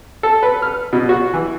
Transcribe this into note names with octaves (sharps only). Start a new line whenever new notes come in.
A4
B4
F6
B2
F#4
E3